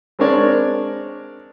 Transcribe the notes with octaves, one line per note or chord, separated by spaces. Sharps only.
G#3 C4 D4 A#4 C#5 D5